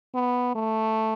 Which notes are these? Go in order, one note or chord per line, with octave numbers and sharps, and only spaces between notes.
B3
A3